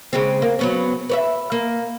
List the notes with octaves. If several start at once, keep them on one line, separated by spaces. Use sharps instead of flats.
C#3 G#3 C4
A#3
F#3 B3 C#4
B4 C#5 E5
A#3